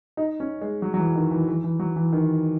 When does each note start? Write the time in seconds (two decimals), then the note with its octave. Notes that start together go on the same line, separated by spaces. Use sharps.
0.17 D#4
0.40 C#4
0.62 G#3
0.82 F#3
0.94 F#3
0.98 E3
1.16 D#3
1.31 E3
1.48 E3
1.64 E3
1.80 F#3
1.96 E3
2.13 D#3